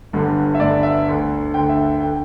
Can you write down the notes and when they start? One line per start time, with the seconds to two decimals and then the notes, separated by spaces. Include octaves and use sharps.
0.13 G1 G2 D3
0.55 E5
0.60 G1 G2 D3 D5
0.83 E5
1.08 D2 D3
1.54 D2 D3 G5
1.69 E5
2.00 D3 G5